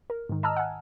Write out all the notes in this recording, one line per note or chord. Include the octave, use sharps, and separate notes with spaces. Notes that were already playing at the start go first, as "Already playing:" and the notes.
A#4
G#2 D#3
D#5 A5 A#5 E6 F6
F#5 G#5